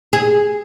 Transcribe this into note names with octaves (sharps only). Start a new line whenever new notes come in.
G#4